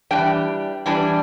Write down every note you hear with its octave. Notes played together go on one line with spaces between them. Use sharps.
E3 G3 D4 G5
E3 G3 D4